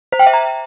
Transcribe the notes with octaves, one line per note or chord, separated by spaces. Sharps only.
C5
G5
E5
A#5